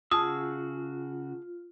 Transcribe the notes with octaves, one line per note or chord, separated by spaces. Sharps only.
C#3 F4 F#4 G#4 A5 D#6 E6